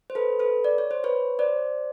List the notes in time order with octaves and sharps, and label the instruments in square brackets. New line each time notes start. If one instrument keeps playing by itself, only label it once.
[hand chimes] C5
A4 B4
A4 B4
D5
C#5
C5
B4 C#5
C5 D5